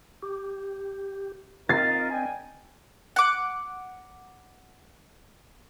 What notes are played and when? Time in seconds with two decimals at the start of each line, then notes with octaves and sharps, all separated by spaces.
0.23 G4
1.69 C4 D#4 F4 A#4 D#5 A6 C7
2.10 D4 G5 G#5
3.16 F#5 D6